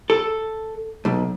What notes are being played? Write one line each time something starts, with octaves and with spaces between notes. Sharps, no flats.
A4
B1